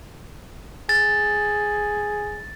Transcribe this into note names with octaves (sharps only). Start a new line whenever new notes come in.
G#4 A6